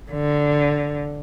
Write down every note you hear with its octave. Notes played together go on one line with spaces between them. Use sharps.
D3